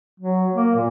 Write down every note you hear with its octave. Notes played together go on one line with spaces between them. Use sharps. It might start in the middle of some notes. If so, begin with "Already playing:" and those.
F#3
A#3
A#2